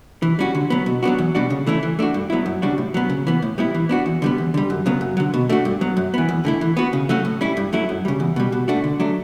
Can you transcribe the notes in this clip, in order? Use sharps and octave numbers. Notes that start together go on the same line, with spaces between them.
E3
G3 C#4 F#4
D3
F#3 B3
B2
F#3 B3 D4 F#4
E2
B2 G3 D4 F#4
C#3
E3 A3 C#4 E4
E3
A3 D4 F#4
G2
F#3 B3 E4
F#2
C#3 G3 D4 F#4
A2
F#3 B3
C#3
E3 B3
A2
G3 B3 E4
E3
B3 D4 F#4
E2
D3 G3 B3
E2
D3 G3
F#2
C#3 F#3 B3
F#2
D3 F#3
B2
A3 D4 F#4
G2
F#3 B3
F#2
E3 B3
E2
D3 A3 E4
E3
B3 F#4
C#3
F#3 A3 C#4 F#4
A2
G3 C#4 E4
G2
F#3 A3 C#4 E4
F#2
C#3 G3
E2
B2 G3
B2
A3 D4 F#4
D3
F#3 A3 D4